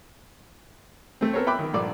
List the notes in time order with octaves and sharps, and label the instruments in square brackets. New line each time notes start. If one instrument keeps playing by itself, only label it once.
[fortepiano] A3 C4
B3 A4 A#4 C5 C#5
E5 G5 B5 D6 F#6
D#3
A#1 G2 A4 D5 D6